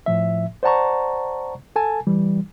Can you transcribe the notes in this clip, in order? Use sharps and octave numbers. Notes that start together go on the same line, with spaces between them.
A2 F3 E5
C5 D5 F#5 A5 A#5 C#6
A4 G#5 A5
E3 G3